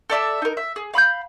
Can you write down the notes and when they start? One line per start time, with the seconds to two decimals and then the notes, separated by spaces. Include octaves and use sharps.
0.09 A4 D5 E5 A5
0.42 D#4 A#4
0.57 E5
0.76 G#4
0.94 F5 B5 D#6 G6